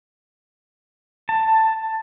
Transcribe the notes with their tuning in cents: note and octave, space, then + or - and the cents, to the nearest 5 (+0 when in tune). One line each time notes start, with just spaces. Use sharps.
A5 +10